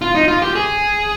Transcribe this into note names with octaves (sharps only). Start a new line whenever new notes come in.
F4
D#4
F4
G4
G#4